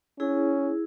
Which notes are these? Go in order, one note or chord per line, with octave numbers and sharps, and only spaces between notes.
C#4 E4 G#4